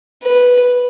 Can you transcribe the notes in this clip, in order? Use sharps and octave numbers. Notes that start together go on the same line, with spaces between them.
B4